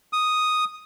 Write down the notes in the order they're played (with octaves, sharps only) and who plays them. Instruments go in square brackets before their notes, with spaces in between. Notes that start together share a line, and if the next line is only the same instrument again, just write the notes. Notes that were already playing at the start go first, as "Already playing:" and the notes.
[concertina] D#6